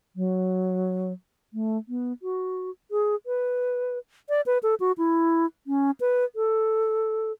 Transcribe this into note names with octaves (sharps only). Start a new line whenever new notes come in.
F#3
A3
B3
F#4
G#4
B4
D5
B4
A4
F#4
E4
C#4
B4
A4